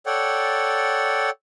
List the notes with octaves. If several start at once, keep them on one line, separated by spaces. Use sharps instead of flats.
A4 C#5 D5 F#5 G5